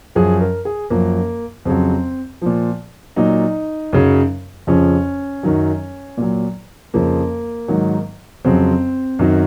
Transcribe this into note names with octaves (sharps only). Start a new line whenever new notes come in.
F#2 F3 G#4
A#4
G#4
F#2 F3 A#3
F2 C#3 F#3 C4
A#2 F3
A#2 F#3 D#4
F#2 C#3 F#3
F2 C#3 F3 C#4
F#2 D#3 F#3
A#2 F#3
F2 C#3 F3 A#3
G#2 D#3 F#3
F2 C#3 F#3 C4
F#2 D#3 F#3